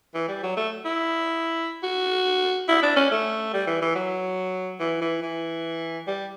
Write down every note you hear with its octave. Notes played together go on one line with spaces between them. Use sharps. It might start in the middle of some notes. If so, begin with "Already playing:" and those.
E3
G3
F#3
A3
E4
F#4
E4
D4
C#4
A3
G3
E3
E3
F#3
E3
E3
E3
G3